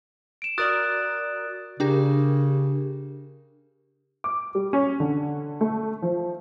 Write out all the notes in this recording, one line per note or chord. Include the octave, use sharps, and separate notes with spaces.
D7 E7
F#4 A#4 D5 D#6 F#6 A6
C#3 D4 G4 A#4
D6
G3
C#4
D3
A3
F3